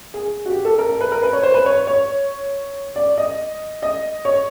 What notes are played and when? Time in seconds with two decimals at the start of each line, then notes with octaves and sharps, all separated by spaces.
0.14 G#4
0.46 F#4
0.50 G4
0.65 A4
0.79 A#4
0.89 A#4
1.01 B4
1.12 A#4
1.22 B4
1.33 C#5
1.43 C5
1.54 B4
1.66 C#5
1.87 C#5
2.96 D5
3.18 D#5
3.82 D#5
4.25 C#5